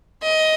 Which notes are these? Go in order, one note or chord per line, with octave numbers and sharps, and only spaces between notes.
D#5